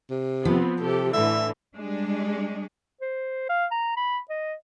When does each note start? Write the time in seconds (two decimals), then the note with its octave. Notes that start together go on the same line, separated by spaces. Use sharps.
0.10 C3
0.45 F3 B3 C4
0.80 C3 G4 A4
1.13 A2 D3 E3 E5
1.76 G3 G#3 D4
3.01 C5
3.49 F5
3.71 A#5
3.97 B5
4.30 D#5